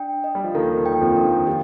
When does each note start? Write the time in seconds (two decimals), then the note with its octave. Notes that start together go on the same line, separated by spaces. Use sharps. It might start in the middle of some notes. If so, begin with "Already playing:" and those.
Already playing: D4 G5
0.24 D#5
0.35 G3
0.44 F3
0.55 D#2 D#3 A4
0.77 D#2 D#3
0.86 G5
1.01 F2 F3
1.16 D4
1.24 D#2 D#3
1.47 F3 G4